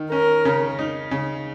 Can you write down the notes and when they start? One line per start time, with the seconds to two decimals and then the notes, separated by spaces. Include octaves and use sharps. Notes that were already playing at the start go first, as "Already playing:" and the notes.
Already playing: D#3
0.12 C#4 A#4
0.45 C#3
0.79 D#4
1.11 C#3